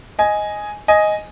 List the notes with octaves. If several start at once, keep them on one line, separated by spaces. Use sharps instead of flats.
D#5 G#5
D#5 G#5